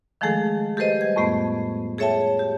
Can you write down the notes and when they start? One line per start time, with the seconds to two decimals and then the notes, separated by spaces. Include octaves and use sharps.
0.21 D#3 F3 G#3 A3 G#4 A4
0.77 G4 A4 B4 C5 D#5
1.01 G3 G#6
1.16 F2 A2 A3 B3
1.98 G#4 A4 C#5 E5 G5 A5
2.39 G4